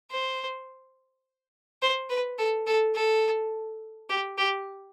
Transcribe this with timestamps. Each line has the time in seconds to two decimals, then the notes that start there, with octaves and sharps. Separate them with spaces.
0.11 C5
1.82 C5
2.10 B4
2.38 A4
2.67 A4
2.95 A4
4.09 G4
4.38 G4